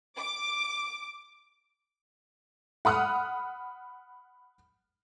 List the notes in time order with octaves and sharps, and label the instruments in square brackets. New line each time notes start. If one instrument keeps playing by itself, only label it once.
[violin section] D6
[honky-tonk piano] F#5 B5 D#6 F6 F#6